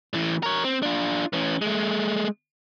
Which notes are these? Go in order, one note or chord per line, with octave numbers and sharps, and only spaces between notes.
A2 E3
A#4 C#5
C4
D4 F4
E3 C#4
G#3 A3